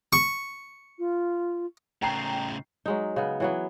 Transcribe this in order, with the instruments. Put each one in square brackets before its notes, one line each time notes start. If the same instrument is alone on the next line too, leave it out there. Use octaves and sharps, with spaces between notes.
[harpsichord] C#6
[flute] F4
[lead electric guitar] A2 C#3 [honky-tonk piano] G5 A#5 C7
[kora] F#3 G#3 D#4
C#3 B3
E3 F#3 B3